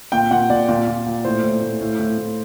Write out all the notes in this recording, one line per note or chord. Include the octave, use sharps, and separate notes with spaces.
A#2 G5
A#2 F#5
A#2 D5
A#2
A#2
A#2
A2 C5
A2
A2
A2
A2
A2